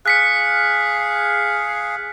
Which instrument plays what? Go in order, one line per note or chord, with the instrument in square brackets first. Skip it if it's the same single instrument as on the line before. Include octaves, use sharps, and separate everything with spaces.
[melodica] G#4 F5 [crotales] F#6 B6 C#7